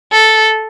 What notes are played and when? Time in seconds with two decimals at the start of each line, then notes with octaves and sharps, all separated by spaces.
0.12 A4